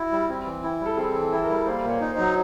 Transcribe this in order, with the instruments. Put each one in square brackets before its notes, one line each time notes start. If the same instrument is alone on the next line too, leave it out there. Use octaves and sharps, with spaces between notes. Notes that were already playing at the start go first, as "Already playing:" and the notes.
Already playing: [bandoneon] E4 [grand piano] F#4
[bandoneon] G3
C4
E3
E4
G3
[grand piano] A4
[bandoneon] C4 [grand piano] G#4
[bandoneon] E3
[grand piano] A4
[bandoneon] E4 [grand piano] A4
[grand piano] A#4
[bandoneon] G3
[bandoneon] A#3 [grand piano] C5
[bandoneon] A#2
[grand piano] C#5
[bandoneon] D#4
[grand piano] C5
[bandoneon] F#3